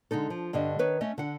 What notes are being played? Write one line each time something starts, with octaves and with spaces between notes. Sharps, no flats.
D3 G#3 D#4 A4
F3
G2 D3 G3 D#5
D#3 B4 C#5
A3 C#4 D#5
D3 F#5